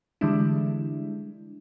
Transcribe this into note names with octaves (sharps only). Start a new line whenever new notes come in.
D3 E3 G3 G#3 D4 E4